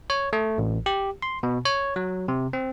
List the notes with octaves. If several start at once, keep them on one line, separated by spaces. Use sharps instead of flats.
C#5
A3
A1
G4
C6
B2
C#5
F#3
C3
C4